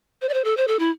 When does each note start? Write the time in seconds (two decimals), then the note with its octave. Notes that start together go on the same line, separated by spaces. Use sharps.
0.22 C5
0.29 D5
0.34 C5
0.44 A4
0.57 C5
0.68 A4
0.79 E4